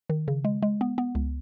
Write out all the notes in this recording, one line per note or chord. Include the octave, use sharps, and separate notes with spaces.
D#3
C#3
G#3
G#3
B3
B3
C#2